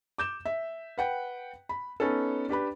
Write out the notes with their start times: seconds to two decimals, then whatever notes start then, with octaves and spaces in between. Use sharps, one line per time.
0.18 D6 G6 E7
0.45 E5
0.98 B4 F#5 G5
1.69 B5
2.00 B3 C#4 D#4 A4
2.49 D4 G4 B4 B5